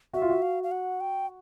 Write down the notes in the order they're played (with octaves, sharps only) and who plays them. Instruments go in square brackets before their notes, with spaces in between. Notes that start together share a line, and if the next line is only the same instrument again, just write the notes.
[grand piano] F#4 [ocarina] E5
[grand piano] F4
F#4
[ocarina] F5
F5
F#5
G5